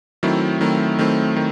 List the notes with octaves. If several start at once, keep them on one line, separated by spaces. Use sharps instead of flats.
D#3 F#3 A3 C4 E4
D#3 F#3 A3 C4 E4
D#3 F#3 A3 C4 E4
D#3